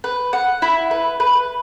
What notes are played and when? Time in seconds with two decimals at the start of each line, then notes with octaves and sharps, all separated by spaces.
0.04 B4
0.33 F#5
0.62 E4
0.91 B4
1.20 B4